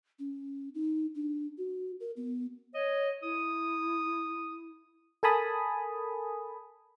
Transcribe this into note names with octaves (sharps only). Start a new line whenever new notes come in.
C#4
D#4
D4
F#4
A#4
B3
C#5 D#5
E4 D#6
A4 A#4 G#5 A5 B5 D#6